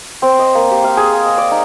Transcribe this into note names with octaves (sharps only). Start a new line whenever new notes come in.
C4
D#5
A#3
G4
F5
G#4
G#5
D#5
D5
D#4